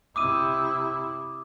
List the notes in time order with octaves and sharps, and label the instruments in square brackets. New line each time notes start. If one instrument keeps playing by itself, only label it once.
[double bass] C3 E4 [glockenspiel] D6 D#6 D#7